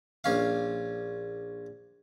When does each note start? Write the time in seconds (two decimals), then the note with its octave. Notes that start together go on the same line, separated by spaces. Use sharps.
0.24 A#1 C#4 F5